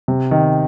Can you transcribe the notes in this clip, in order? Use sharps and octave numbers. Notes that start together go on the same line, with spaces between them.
C3
D#3